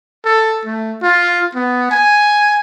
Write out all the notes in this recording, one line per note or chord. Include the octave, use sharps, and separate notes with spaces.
A4
A3
F4
B3
G#5